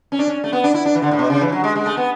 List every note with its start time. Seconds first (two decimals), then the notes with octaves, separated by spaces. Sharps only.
0.12 C#4
0.19 D4
0.27 C#4
0.44 A3
0.53 B3
0.64 D4
0.74 E4
0.85 D4
0.95 E3
1.02 D3
1.11 A2
1.19 B2
1.30 C#3
1.41 E3
1.52 F#3
1.64 G#3
1.76 G#3
1.86 A3
1.97 B3